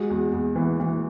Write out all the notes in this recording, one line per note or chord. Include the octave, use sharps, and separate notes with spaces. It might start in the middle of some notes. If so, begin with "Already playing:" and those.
Already playing: G#3 F#4
E2
E2
E3
E3